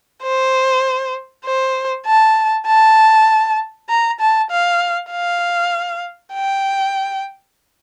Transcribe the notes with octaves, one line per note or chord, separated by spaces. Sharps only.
C5
C5
A5
A5
A#5
A5
F5
F5
G5